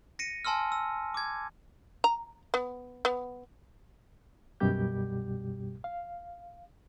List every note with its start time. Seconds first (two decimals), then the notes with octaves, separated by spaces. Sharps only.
0.19 A#6 C#7 D#7
0.45 G#5 A5 C6 E6 F6
0.72 E6
1.14 D6 G#6
2.04 A#5
2.54 B3
3.05 B3
4.60 C2 F#2 B2 G3 G4 G6
5.84 F5